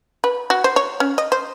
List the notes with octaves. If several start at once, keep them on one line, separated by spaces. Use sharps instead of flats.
B4
F#4
C5
C#5
C#4
D#5
C5